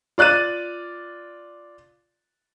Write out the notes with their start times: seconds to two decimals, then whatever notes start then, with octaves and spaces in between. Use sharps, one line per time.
0.18 F4 D5 F#6 A6 D#7